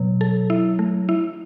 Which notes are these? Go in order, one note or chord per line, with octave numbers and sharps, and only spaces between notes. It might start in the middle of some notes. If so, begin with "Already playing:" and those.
Already playing: B2 F#3
A4
E4
A3
E4